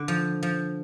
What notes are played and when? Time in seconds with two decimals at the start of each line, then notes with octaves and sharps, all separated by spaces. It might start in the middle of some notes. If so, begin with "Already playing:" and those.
Already playing: D3
0.08 F3
0.43 F3